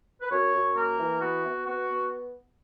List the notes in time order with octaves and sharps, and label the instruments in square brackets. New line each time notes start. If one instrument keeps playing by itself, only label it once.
[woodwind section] B4
F#2 C#5
F#2
A#3 A#4
E3
B3 F#4
B3
B3 F#4
B3